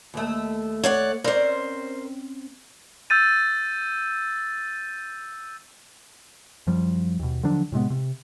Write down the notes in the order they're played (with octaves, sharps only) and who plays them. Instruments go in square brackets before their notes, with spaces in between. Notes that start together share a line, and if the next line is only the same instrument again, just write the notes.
[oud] D#2 A3
[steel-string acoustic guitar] C#5 D5 F#5
[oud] C4 C#4 D5 [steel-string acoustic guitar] A#4 C5
[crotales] E6 G6 A6 D#7
[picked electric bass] F#2 F3 G3
D#2 B2
D3 F3 F#3 D4
A2 C3 G#3 B3
C3